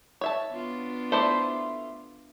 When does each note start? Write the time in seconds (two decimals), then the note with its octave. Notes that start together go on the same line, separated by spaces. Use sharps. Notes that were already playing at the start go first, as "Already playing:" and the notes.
0.21 C#5 E5 A5
0.52 B3 D4 F4
1.12 A3 E4 C5 D5